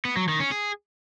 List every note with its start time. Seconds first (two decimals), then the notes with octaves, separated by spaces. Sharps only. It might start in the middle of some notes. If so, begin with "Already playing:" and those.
0.05 B3
0.17 F#3
0.28 D#3
0.40 C#4
0.51 G#4